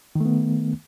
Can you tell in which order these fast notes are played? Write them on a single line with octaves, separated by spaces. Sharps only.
D#3 A3 B3